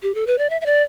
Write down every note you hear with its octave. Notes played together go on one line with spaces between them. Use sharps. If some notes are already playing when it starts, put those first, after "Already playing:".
G4
A4
B4
D5
E5
E5
D5